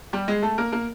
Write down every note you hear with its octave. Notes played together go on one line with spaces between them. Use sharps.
G3 G4
G#3 G#4
A3 A4
A#3 A#4
A#3 A#4